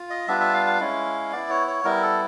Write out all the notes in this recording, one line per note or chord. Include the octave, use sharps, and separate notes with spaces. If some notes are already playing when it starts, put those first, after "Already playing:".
Already playing: F4
D#5
G3 B3 D4 F4 E5
E5
F5
F5
G#3 C#4 E4
B3 E4 D5
C#5
C#5
G3 B3 E4 A#4
A4